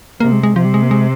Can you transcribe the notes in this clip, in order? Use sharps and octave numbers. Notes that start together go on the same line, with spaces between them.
C3 A#3
G#3
G#3
C3 F3
G3
G#3
A#3
G#3